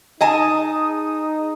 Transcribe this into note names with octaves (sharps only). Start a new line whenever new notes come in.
D#4 G#4 D#5 G#5 A5 D#6